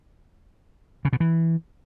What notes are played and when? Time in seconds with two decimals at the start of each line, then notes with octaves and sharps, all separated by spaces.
1.05 C#3
1.13 B2
1.20 E3